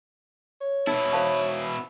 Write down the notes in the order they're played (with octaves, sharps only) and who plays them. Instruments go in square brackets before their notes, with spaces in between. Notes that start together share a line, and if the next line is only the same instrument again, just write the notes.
[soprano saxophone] C#5
[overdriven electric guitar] B2 E4 [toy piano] D#4
[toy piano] C5 F5 A5